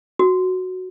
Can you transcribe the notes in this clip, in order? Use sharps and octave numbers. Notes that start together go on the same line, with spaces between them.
F#4